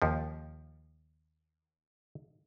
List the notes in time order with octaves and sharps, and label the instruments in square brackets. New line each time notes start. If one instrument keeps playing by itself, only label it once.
[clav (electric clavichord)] D#2 F3